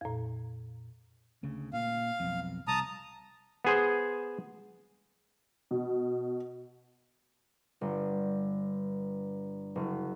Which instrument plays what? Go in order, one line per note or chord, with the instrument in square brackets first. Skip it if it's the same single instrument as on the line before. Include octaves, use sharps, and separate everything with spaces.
[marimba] F2 A#2
[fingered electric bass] D2 C#3
[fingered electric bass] A#2 [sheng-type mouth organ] F5
[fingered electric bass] B1 F2
[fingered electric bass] C2 [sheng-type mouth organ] A5 A#5 D#6
[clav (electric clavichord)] B3 G#4 C5
[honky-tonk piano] B2
[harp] G1
F#1